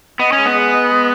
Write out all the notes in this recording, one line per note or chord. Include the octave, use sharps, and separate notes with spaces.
B3 D#5
C#4
G#3
B3
G#4
D#5
G#3